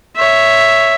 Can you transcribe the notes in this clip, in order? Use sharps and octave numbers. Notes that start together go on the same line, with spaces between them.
C#5 E5